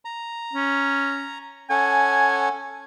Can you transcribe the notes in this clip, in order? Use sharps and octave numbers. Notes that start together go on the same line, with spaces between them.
A#5
C#4
C#4 A4 F#5 G#5